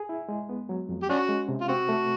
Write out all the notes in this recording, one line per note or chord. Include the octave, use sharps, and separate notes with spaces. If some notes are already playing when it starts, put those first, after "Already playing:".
Already playing: G#4
E4
G#3
B3
F#3
F2
G4
C#4 D4 F#4
G#3
C3
F4
C4 F#4
A3